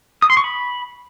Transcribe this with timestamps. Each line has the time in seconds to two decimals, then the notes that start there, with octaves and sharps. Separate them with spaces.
0.22 D#6
0.30 C6
0.37 C#6
0.44 B5